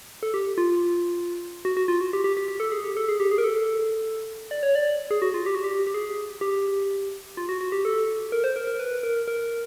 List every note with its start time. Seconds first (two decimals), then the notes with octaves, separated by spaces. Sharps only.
0.23 A4
0.34 G4
0.58 F4
1.65 F#4
1.77 F#4
1.88 F4
2.01 F#4
2.13 G4
2.24 G4
2.37 G4
2.48 G4
2.60 A4
2.72 G#4
2.84 G4
2.97 A4
3.09 G#4
3.20 G4
3.31 G#4
3.38 A#4
3.44 A4
4.51 D5
4.63 C#5
4.75 D5
5.11 G#4
5.22 F#4
5.34 F4
5.46 G4
5.55 F#4
5.64 G4
5.87 G4
5.94 G#4
6.41 G4
7.37 F4
7.49 F#4
7.61 F#4
7.72 G4
7.85 A4
8.32 A#4
8.44 C5
8.56 A#4
8.67 A#4
8.79 B4
9.03 A#4
9.28 A#4